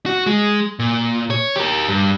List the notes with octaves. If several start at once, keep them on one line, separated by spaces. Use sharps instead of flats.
F#4
G#3
A#2
C#5
G4 A#4
G2